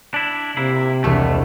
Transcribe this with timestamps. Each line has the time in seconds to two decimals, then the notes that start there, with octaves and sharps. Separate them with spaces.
0.14 D4 E4
0.57 C3 A#3 E4
1.04 E1 C2 A3